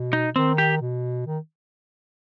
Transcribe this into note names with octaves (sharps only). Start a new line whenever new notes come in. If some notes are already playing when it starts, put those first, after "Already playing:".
Already playing: B2
D#4
D#3 C4
G4
B2
D#3